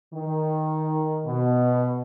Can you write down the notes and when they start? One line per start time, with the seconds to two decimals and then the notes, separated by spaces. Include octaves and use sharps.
0.14 D#3
1.26 B2